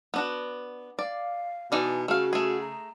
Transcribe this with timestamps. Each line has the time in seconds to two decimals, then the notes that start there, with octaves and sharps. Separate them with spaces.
0.14 B3 D4 F#4
0.99 D5 F5
1.72 B2 E3 D#4 D5 G#5
2.08 C#3 A3 F#4 F5
2.33 A3 G#4
2.61 A#5